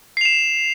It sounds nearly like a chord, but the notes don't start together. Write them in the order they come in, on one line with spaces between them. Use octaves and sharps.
C7 F7 E7